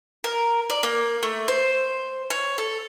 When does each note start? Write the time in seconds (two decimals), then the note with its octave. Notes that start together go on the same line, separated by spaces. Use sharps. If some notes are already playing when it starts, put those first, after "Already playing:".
0.24 A#4
0.70 D5
0.83 A#3
1.23 A3
1.48 C5
2.30 C#5
2.58 A4